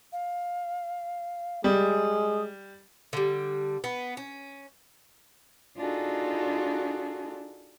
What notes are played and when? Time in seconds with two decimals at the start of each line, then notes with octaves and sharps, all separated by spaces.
0.13 F5
1.64 G3 G#3 D#6
3.13 D3 G3
3.84 B3
4.17 C#4
5.77 D4 D#4 F4 F#4 G#4 A4